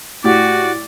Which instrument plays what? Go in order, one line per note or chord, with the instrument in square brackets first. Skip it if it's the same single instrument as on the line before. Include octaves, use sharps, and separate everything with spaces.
[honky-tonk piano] A2 G4 [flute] F#4 [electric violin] D5